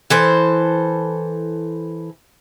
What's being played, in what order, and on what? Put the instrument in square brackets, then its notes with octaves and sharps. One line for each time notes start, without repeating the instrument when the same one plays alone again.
[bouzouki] E3 A4 C5